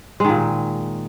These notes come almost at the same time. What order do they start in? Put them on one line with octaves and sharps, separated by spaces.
G#3 D#3 A#2